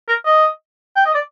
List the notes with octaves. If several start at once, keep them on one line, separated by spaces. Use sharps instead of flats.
A#4
D#5
G5
D#5
D5